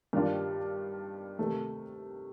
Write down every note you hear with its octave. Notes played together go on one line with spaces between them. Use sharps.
G2 D#3 G3 D4 F4
C3 D#3 A3